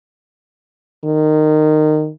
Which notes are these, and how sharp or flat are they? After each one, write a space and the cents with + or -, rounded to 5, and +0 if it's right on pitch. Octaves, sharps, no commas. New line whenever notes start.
D#3 -20